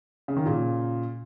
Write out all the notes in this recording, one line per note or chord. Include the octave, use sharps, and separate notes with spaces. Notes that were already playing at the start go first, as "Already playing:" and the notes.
C#3
D#3
A#2 C#3